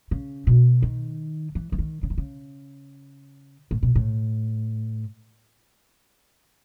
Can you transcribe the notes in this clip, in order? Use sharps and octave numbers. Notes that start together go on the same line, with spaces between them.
C#3
B2
D#3
E3
E3
D#3
C#3
D#3
C#3
A2
B2
A2